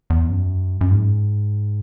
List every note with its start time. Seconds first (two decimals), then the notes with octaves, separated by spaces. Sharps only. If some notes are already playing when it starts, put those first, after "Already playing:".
0.10 E2
0.30 F#2
0.81 F#2
0.91 G#2